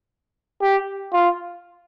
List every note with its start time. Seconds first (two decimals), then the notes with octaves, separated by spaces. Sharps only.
0.62 G4
1.13 F4